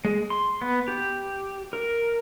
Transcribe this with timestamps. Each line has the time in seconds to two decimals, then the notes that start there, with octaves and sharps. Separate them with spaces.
0.05 G#3
0.30 C6
0.62 B3
0.88 G4
1.73 A#4